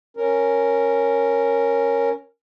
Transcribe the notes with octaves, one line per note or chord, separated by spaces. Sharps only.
C#4 A#4